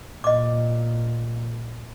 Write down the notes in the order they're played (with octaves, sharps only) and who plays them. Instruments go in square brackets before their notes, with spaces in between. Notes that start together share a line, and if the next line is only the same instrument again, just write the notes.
[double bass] A#2 [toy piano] D#5 D6